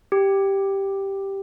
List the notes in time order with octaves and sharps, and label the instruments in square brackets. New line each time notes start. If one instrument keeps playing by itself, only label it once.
[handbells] G4